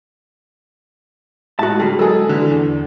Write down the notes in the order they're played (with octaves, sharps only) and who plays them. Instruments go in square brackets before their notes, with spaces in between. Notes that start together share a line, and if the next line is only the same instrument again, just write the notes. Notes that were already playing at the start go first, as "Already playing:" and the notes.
[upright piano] A2 G#3 [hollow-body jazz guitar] F#4 A5
[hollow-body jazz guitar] D3 G#4 [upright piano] G3
[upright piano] F#3 G#3 G#4 [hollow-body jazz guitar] A4
[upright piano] D3 E3
E2 D4